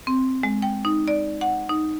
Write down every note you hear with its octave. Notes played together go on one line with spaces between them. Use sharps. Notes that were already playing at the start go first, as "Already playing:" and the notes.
C4
G#3
G5
D#4
D5
F#5
D#4